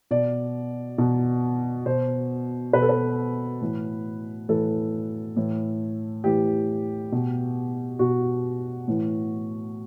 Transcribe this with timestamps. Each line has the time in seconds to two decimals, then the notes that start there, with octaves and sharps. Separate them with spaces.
0.11 B2 D5
0.98 B2
1.86 B2 C5
2.73 B2 B4
2.82 A4
2.89 B4
3.62 A2 E3
4.49 A2 E3 A4
5.36 A2 E3
6.24 A2 E3 G4
7.12 B2
7.99 B2 F#4
8.88 A2 E3